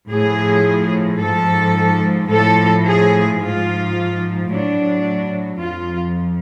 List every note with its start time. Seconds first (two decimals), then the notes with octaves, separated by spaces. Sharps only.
0.11 A2 F3 G#4
1.21 G#2 F3 A4
2.31 A2 F3 A4
2.86 G#4
3.40 G#2 F3 F4
4.51 A2 F#3 D4
5.60 F2 F3 F4